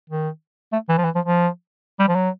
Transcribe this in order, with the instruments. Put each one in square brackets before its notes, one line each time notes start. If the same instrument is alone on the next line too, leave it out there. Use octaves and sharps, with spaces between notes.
[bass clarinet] D#3
A3
E3
F3
E3
F3
F3
G3
F3
F#3